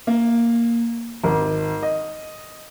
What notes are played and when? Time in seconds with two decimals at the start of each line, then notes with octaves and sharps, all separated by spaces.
0.07 A#3
1.24 G#1
1.83 D#5